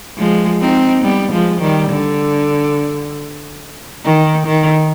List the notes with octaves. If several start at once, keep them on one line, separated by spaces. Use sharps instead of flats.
F3 G#3
C4 D#4
G3 B3
F3 G#3
D#3 G3
D3
D#3
D#3